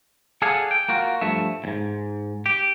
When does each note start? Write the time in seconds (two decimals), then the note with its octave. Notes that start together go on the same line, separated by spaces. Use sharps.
0.42 G#4 A4 D5 F5 F#5 G#5
0.71 G5
0.89 A#3 F4 F#4
1.21 G2 F3 A3 E5
1.64 E2 G#2
2.46 G4